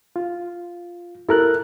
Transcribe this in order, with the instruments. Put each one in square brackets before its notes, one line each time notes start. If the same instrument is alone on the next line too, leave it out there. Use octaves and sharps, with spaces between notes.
[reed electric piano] F4
[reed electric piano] E4 A#4 F#6 [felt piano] A4